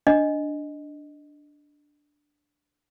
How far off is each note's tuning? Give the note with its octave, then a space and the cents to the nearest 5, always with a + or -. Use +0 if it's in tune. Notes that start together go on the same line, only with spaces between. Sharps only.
D4 +0 D#5 +0